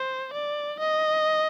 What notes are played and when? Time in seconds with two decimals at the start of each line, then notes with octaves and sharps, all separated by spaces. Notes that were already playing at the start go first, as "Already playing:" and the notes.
Already playing: C5
0.33 D5
0.80 D#5